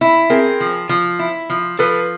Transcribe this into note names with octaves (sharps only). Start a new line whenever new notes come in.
E4
C4 G#4 A#4
F3
F3
E4
F3
F3 A4 B4